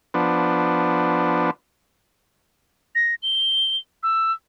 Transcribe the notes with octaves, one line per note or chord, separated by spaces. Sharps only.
F3 B3 D4
A#6
G7
E6